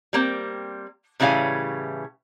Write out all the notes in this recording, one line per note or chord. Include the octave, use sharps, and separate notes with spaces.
G3 A#3 C4
A2 C#3 E3 G3 F5 G#5